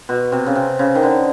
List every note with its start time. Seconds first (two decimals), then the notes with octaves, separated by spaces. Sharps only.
0.09 B2
0.32 C3
0.46 C#3
0.55 C3
0.79 C#3
0.95 D#3
1.03 D3